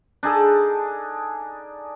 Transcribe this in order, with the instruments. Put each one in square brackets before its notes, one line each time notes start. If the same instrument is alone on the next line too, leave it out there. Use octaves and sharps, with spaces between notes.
[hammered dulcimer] D4 D#4 G#4 A4